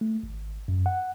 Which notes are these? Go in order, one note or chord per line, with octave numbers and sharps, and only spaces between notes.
A3
G#1
F#2
F#5